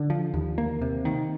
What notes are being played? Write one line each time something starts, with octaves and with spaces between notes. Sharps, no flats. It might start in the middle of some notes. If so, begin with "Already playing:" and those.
Already playing: D3
F3
D#2
A#3
C3
D#3